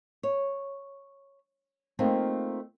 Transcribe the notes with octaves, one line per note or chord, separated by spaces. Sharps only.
C#5
A3 A#3 C4 D#4 F4